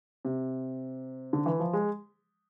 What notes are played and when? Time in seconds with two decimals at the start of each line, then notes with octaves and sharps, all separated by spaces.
0.25 C3
1.33 D3
1.46 E3
1.60 F3
1.73 G#3